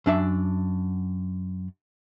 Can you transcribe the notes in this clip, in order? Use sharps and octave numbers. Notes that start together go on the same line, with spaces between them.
F#2 D4 E5